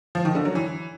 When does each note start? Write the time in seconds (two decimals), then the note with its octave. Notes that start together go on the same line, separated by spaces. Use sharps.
0.15 F3
0.25 D#3
0.35 D3
0.45 F#3
0.55 E3